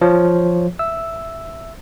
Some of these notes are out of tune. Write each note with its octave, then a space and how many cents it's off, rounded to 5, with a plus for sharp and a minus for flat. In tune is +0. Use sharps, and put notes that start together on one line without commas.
F3 +0 C#5 +0
E5 +5 E6 +0